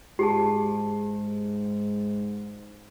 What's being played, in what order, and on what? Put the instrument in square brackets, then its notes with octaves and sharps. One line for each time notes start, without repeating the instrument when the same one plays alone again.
[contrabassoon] G#2 [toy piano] G4 G#4 A5